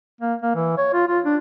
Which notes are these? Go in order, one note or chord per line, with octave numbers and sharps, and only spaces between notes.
A#3
A#3
E3
C#5
F4
F4
D4